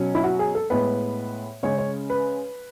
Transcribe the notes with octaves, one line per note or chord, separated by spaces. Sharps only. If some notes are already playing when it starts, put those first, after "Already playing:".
Already playing: B2 F#3 C#4
E4
F#4
G#4
A4
A2 G#3 B3 B4
C#3 G#3 C#4 C#5
C#5
B4